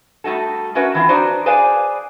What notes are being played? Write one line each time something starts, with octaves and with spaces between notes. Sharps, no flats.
G3 A3 D#4 F#4 A4
C#4 F#4 A#4 B4 E5 F#5
E3 C4 D#4 F4
D4 D#4 F#4 B4 C5
G#4 B4 C5 D5 F5 G#5